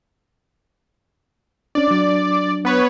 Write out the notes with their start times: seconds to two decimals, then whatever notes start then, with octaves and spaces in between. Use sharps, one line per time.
1.75 C#4 D4 D5
1.88 F#3 D4
2.65 B3 B4 C#5